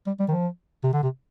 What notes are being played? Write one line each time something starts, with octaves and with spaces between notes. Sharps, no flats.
G3
G3
D#3
F3
C3
D3
C3